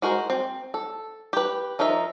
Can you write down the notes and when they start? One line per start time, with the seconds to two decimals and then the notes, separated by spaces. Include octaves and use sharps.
0.02 G#3 F#4 A#4 C5
0.30 C4
0.74 A4
1.33 G4 B4
1.79 F3 D#4 A#4 E5 A#5